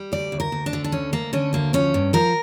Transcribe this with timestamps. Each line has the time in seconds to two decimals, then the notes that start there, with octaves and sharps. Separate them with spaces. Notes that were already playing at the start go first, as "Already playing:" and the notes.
Already playing: G3
0.12 D2 D5
0.32 D2
0.40 A#4
0.52 D2
0.66 D4
0.73 D3
0.84 D4
0.92 D2 C#4
1.13 D2 A#3
1.33 D3 C#4
1.53 D2 A#3
1.73 F3 C#4
1.94 G2
2.13 F3 A#4